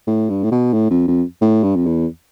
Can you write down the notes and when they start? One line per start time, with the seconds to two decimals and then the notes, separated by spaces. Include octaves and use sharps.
0.07 A2
0.30 G2
0.43 A2
0.52 B2
0.74 A2
0.91 F2
1.08 F2
1.42 A2
1.64 G2
1.76 F2
1.86 E2